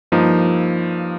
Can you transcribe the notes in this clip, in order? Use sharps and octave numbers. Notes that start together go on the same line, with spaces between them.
G2 F3 A#3 D#4